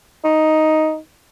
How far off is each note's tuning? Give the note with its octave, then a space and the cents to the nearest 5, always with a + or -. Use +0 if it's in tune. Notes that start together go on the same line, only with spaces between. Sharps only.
D#4 +5